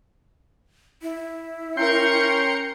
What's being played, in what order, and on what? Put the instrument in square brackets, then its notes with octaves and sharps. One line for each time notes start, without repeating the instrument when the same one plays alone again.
[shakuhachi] E4
[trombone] C#4 [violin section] A#4 C#7 [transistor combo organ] G5 C6